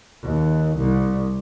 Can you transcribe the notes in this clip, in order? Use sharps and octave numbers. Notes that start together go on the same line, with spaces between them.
D#2
C2